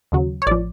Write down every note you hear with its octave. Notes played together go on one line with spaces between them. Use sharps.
D#2 C#3 F#3
C#5
A1 F3 D5